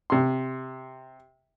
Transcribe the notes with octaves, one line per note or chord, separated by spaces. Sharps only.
C3 C6